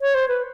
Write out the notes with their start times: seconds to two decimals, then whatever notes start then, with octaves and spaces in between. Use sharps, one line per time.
0.01 C#5
0.14 C5
0.28 B4